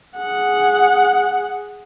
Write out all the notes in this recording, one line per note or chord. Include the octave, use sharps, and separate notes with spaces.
G#4 F#5